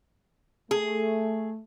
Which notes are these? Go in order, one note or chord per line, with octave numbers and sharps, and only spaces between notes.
A3 G#4